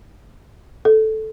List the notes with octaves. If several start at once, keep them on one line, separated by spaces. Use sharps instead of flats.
A4